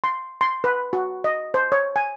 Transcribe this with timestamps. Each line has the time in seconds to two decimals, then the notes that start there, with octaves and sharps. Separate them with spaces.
0.04 C6
0.41 C6
0.64 B4
0.93 F#4
1.24 D#5
1.54 C5
1.72 C#5
1.96 G#5